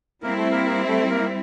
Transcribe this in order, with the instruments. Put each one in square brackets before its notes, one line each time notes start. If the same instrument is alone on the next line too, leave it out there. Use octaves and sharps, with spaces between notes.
[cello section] G3 C4 E4 [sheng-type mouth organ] A#3 A#4
[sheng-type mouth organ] A3 A4
A#3 A#4
A#3 A#4
A3 A4
A#3 A#4